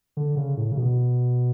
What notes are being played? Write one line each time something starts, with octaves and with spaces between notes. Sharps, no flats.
D3
C#3
A2
C#3
B2